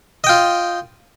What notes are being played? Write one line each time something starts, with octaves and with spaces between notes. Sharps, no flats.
F4 D#5 G5